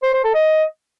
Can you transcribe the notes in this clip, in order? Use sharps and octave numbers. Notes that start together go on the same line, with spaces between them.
C5
C5
A4
D#5